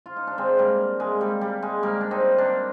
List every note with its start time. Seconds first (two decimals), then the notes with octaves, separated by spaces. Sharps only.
0.06 F4
0.17 D#4
0.27 D4
0.38 G#3 C4
0.59 G3 A#3
1.00 G#3
1.21 G3
1.41 G3
1.63 G#3
1.83 G3 A#3
2.01 D4
2.11 C4 D#4
2.38 A#3 D4